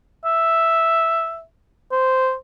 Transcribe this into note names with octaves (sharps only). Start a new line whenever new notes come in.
E5
C5